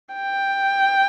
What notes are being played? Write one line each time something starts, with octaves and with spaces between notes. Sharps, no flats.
G5